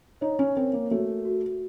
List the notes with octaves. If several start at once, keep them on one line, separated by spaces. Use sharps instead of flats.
D#4 C#5
C#4
C4 A#4
A#3
A3 F#4
F#4